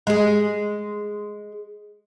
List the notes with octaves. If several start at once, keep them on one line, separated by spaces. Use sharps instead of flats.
G#3 G#4